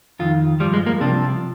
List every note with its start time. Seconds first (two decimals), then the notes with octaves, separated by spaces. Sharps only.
0.19 F2 D#3 F4
0.60 F3 G3
0.64 G2
0.74 G#3
0.86 A#3
1.00 C2 C3 F3 D4